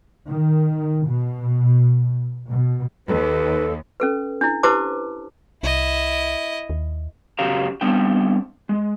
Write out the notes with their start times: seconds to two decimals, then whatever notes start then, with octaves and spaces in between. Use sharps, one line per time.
0.27 D#3
1.04 B2
2.49 B2
3.08 D#2 A4 B4
4.00 C#4 A4 B4
4.41 D4 E4
4.63 E4 G4 B4 C5 A5 D6
5.63 C2 E4 D#5
6.70 D#2
7.39 F#2 C#3 F#3 G4 F5 A#5
7.81 G3 B3 C4 D4 G5
8.69 G#3